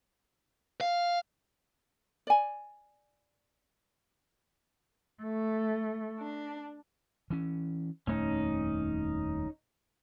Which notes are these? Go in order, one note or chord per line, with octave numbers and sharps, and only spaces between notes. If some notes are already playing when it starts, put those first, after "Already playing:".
F5
D5 G#5
A3
D4
E3 C#4
D#1 F2 A3 C#4 D#4